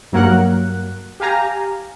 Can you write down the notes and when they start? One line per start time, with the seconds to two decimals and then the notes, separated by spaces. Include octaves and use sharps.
0.12 G2 F#3 A#3 A#4 F#5 F#6
1.20 G4 F5 G#5 A#5